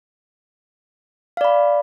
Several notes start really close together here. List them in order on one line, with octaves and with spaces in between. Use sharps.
F5 D5 B5